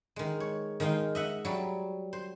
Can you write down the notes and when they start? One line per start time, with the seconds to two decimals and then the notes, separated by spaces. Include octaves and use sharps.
0.16 D#3 G#3
0.40 C#5
0.80 D#3 G#3 D#4 F5 G5
1.15 D#5 E5 F#5
1.45 F#3 G3
2.13 C5